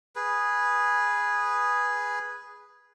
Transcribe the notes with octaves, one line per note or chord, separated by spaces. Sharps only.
G#4 B4